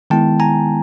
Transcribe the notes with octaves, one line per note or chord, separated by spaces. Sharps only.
D#3 G#3 B3 E4 G5 A5
G#5 A#5